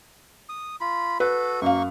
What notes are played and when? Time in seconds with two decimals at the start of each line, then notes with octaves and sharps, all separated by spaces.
0.49 D#6
0.81 F4 B5
1.20 F#4 A4 B4
1.62 F#2 A#3 F5 C#6